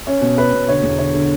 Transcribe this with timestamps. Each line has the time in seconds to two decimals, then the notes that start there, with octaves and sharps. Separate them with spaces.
0.07 C#4
0.22 B2
0.37 C#4 B4
0.53 B2
0.68 D3 C#5
0.83 E2
0.98 D3 C#5
1.14 D3